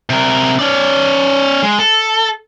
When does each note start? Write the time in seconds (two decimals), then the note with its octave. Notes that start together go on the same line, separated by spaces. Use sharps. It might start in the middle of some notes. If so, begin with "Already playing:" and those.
0.10 C3 A#4
0.59 C#4 D5
1.63 G#3
1.79 A4